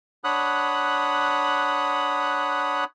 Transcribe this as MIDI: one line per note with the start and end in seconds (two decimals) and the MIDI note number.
0.24 2.84 62
0.24 2.84 73
0.24 2.84 78
0.24 2.84 83
0.24 2.84 87
0.24 2.84 90